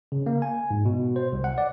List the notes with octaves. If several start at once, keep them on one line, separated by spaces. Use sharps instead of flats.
C#3
A#3
G#5
G#2
B2
C5
C2
F#5
D5